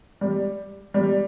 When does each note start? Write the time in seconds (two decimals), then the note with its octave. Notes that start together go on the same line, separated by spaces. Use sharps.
0.21 G3
0.94 G3